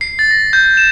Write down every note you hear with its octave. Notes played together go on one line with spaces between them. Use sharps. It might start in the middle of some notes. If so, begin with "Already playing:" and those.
C7
A6
A#6
G6
E7